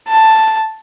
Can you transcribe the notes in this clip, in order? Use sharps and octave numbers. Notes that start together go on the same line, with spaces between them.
A5